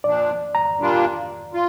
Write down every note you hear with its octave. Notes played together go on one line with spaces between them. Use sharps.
A#2 F3 D4 D5
A#5
A#2 G3 A#3 D4 F4
F4